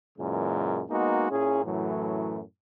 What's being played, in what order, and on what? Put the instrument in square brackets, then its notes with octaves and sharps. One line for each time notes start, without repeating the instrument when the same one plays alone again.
[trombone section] F#2 A#2 C#3 E3 G#3
G#3 A#3 B3 D#4 F#4
A#2 C#4 E4 G#4
F#2 A2 E3 F#3 A3